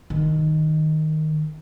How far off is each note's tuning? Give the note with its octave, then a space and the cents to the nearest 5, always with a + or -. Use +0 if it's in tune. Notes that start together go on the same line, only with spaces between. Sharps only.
D#3 +0